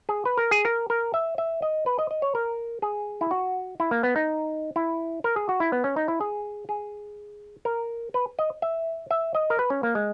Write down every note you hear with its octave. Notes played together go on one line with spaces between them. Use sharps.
G#4
B4
A#4
G#4
A#4
A#4
E5
E5
D#5
B4
D#5
D#5
C#5
A#4
G#4
E4
F#4
E4
A#3
B3
D#4
E4
A#4
G#4
F#4
E4
B3
C#4
D#4
E4
G#4
G#4
A#4
B4
D#5
E5
E5
D#5
A#4
B4
C#4
A#3
G#3